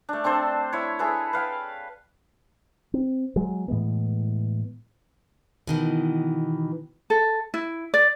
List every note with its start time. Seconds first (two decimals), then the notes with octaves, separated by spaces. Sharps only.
0.09 A3 D4
0.24 C4 D4 A4 C5
0.73 E4 C#5
0.99 E4 G#4 A4 B4
1.33 B4 F5 G5
2.94 C4
3.36 F#3 G#3
3.68 A2 E3 G#3 B3
5.67 B2 D#3 E3
7.10 A4
7.54 E4
7.94 D5